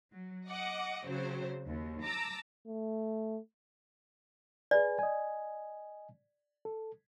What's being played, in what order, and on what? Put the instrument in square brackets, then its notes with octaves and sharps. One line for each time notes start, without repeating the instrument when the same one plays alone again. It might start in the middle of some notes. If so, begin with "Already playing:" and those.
[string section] F#3
D#5 F#5 D6
C#3 F#3 C4 C5
D#2
A5 A#5 D6 E6
[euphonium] A3
[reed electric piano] G#4 B4 G#5 [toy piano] D5
[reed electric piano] D#5 G#5
A4